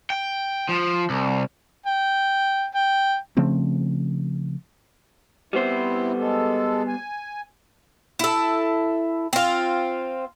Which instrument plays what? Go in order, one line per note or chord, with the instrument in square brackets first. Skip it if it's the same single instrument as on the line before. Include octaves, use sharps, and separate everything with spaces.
[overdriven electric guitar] G5
F3
C2
[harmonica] G5
G5
[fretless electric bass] C#3 F3 A3 C4
[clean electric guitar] G3 B3 C5 [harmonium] C4 E4
[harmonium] G#3 A4
G#5
[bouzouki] E4 A4
C4 F4